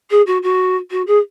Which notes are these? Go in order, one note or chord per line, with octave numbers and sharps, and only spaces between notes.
G#4
F#4
F#4
F#4
G#4